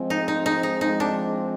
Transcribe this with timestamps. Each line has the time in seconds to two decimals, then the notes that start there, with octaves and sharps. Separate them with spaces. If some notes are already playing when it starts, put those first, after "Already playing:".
Already playing: F3 G#3 C4
0.10 D#4
0.28 D#4
0.46 D#4
0.63 D#4
0.81 D#4
1.00 D4